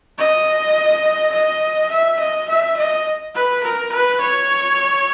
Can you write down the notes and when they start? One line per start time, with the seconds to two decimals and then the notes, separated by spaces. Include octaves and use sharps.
0.19 D#5
1.33 D#5
1.91 E5
2.20 D#5
2.49 E5
2.77 D#5
3.35 B4
3.63 A#4
3.92 B4
4.21 C#5